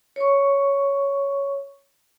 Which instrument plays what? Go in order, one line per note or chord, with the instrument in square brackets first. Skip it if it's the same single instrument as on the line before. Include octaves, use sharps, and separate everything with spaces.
[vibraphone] C#5 C#6